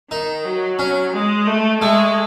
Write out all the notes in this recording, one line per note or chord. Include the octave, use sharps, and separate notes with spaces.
D#3 D#4
F#3
C#4
G#3
A3
G#3 A3